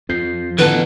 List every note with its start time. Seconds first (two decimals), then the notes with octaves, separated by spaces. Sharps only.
0.09 F2 F3 G6 C7
0.58 D3 E3 B3 A4 B4